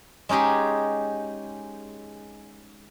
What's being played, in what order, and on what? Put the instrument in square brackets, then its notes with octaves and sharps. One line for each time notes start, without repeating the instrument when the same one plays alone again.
[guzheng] G#3 C#4 D#4 G4 G#4